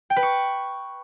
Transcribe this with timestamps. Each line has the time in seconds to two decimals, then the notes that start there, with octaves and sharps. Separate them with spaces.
0.10 G5
0.16 B4
0.23 C#6